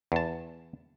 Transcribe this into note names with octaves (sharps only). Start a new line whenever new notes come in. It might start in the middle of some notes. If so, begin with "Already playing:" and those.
E2 A5